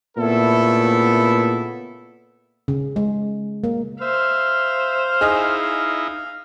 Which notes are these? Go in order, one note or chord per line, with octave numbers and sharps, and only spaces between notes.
A#2 C#3 A3 B3 E4 A4
C#3
G#3
A#3
C5 E5 F5
D#4 E4 G#4 D#5 F6